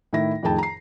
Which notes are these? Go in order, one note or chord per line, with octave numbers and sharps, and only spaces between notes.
A2 D#3 E4 A#6
F2 A2 D#3 G#4 G5 A5
A#5 C7